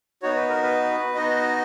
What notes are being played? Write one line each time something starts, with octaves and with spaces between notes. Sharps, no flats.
B3 D#4 F#4 C#5
B4
A#4
B4
B3 D#4 F#4 D#5